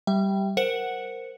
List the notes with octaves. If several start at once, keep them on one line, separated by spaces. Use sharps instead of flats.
G3 E5
A#4 C5 F#5 C#7